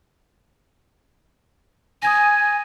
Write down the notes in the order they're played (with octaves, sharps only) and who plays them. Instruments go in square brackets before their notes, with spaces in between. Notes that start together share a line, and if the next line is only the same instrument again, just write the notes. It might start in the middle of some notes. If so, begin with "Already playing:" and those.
[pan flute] G#5 [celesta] D#6 G#6 A#6